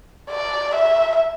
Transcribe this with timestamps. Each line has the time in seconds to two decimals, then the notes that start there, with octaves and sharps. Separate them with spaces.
0.30 D5
0.75 E5